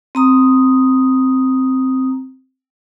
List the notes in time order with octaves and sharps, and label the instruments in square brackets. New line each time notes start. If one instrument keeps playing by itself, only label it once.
[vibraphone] C4 A#5 D#6